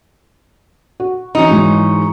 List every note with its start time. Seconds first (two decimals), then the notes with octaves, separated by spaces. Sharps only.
1.00 F#4
1.35 E3 C#4 D#4 E4 F#4
1.50 G#2 E3 F#3